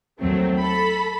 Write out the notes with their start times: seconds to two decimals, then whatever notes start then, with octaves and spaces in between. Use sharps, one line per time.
0.19 D#2 F#3 A3 C4
0.57 A4 B5